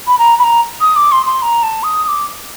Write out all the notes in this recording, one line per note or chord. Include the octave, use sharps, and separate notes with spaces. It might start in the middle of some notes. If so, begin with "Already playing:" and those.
B5
A#5
B5
A#5
D#6
D6
C6
C6
A#5
A5
D#6
D#6
D6